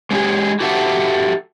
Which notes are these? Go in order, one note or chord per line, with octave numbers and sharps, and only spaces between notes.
G#3 A3 C#4 D#4 G4 G#4
F#4 G4 A4 E5 F#5